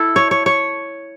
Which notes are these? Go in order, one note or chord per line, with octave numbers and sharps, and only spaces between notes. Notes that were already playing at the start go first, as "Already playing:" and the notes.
Already playing: E4 A4
C#5
C#5
C#5